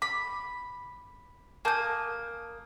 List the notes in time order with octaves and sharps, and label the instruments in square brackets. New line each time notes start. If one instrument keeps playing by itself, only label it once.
[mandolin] B5 [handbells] D6
[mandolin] A#3 D#6 [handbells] G#5 A5 G6